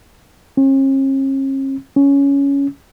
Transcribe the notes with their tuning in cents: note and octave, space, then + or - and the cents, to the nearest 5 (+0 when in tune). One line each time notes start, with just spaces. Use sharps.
C#4 -45
C#4 +10